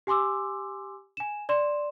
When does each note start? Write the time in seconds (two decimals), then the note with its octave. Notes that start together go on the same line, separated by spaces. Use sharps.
0.07 G4 G#5 C6 D6 E6
1.17 G#5 E7
1.49 D5 C6 E7